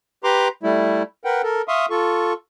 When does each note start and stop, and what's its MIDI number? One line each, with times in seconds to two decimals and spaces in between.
0.24 0.48 67
0.24 0.48 71
0.24 0.48 82
0.24 0.48 84
0.24 0.48 86
0.63 1.03 55
0.63 1.03 57
0.63 1.03 64
1.25 1.42 70
1.25 1.42 71
1.25 1.42 78
1.25 1.42 79
1.43 1.62 69
1.43 1.62 70
1.68 1.86 76
1.68 1.86 77
1.68 1.86 84
1.68 1.86 85
1.68 1.86 87
1.90 2.33 65
1.90 2.33 69
1.90 2.33 85